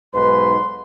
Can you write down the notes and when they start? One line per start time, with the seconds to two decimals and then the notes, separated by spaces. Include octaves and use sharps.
0.13 B1 G#2 B4 C6